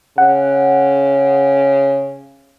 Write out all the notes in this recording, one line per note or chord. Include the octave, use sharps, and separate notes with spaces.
C#3 F#5